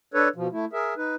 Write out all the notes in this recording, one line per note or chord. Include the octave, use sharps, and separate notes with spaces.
D4 A4 B4 C#5
B2 F3
A3 E4
G#4 A#4 E5
D#4 B4